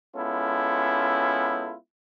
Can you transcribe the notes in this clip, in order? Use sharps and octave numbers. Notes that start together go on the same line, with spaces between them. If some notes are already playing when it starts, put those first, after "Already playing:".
G#3 B3 C#4 E4 F4 A4